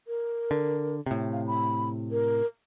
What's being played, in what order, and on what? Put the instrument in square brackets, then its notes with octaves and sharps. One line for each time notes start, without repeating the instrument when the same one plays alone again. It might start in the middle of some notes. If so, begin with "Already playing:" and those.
[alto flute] A#4
[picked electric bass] D3
A2 C3
[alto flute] F5
B5
A#4